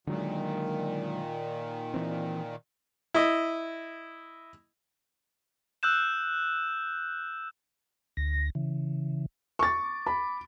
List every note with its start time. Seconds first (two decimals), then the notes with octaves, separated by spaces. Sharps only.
0.07 A#2 D3 D#3 F#3 G#3
1.94 E3 C4
3.14 E4 D#5
5.83 E6 F#6 G6 E7
8.17 D2 A#6
8.55 C#3 E3
9.59 C#6 D6 A6
10.07 B5